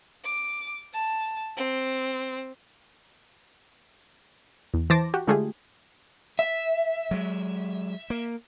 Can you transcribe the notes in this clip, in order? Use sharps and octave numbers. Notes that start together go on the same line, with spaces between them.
D6
A5
C4
E2
E3 C5 A5 D6 A#6
F#4 G4
D3 G#3 A3 F4 G4 G#4
E5
F#3 G#3
A#3